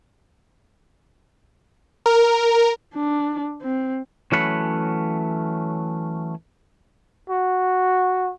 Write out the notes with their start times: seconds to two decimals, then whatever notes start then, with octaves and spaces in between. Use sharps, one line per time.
2.06 A#4
2.94 D4
3.62 C4
4.32 E3 F#3 A3 C#4 F#5 B5
7.30 F#4